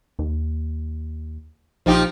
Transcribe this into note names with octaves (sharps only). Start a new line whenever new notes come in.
D#2
A#1 F3 D#4 G4